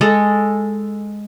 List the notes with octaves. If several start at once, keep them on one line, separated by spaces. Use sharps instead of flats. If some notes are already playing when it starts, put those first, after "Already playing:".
G#3 A4